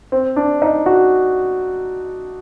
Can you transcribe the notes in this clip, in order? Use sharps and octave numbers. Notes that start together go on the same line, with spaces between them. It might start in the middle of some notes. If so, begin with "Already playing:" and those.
C4
D4
D#4
F#4